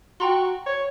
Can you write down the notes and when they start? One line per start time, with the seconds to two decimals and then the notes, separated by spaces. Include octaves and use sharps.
0.20 F#4 G5 A#5 C6
0.66 C#5